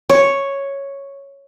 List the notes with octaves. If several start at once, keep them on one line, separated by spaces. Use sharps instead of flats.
C#5